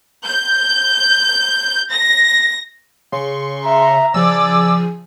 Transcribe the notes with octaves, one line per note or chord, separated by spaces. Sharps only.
G6
A#6
C#3 C6 C#6
E5 A#5
C#3 F3 G#4 D5 G#5 E6